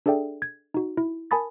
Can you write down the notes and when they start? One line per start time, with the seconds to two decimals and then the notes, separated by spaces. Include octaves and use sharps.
0.06 D4 G#4 A4 D5 E5 G5
0.42 G#6
0.74 D#4 F#4
0.97 E4
1.31 A#4 G#5 A5 B5 D#6 A6